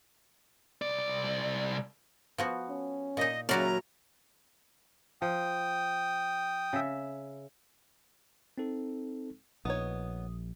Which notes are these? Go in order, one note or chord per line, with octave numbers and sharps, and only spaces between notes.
C2 D5
F3 B3 F#4
C#4
A#2 D#4 D#5
D#2 C#3 F#3 C#4 E4 F#4 D5 A#5
F3 G5 D#6
C#3 E5
C4 D#4 A4
A#1 B3 D#4 C#5 D#6